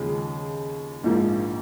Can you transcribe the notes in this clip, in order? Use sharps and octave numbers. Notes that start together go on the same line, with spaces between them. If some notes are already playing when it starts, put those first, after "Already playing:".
Already playing: D#2 C#3 F3 G#3 C#4 G#4
A#1 G#2 F3 A#3